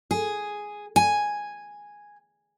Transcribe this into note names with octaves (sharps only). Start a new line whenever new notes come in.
G#4
G#5